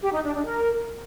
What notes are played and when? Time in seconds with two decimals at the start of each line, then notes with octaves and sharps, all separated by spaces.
0.02 G4
0.13 D#4
0.24 D4
0.35 D4
0.46 A#4